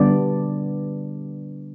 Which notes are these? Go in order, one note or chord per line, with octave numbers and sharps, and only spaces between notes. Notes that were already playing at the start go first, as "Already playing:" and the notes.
Already playing: D3 G3 B3 D4 D5